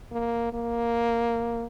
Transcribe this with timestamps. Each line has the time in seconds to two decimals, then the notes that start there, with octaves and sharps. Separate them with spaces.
0.12 A#3
0.53 A#3